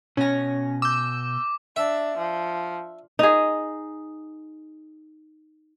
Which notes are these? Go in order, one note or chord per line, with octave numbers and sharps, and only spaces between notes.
B2 C#4 G#5 A#6
D6 E6 G6
D4 E5
F3
D#4 G#4